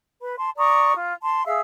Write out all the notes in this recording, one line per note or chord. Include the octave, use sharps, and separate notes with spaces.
B4 B5
A5 C6
D5 A#5 C#6 D#6
F4
A5 C6
G#4 E5 F5 E6